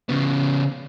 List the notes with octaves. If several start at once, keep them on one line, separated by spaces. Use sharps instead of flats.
C#3 B3